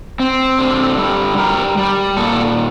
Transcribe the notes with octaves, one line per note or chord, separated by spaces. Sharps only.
C4
D3
G3
G3 A#4
G3
A#2 A4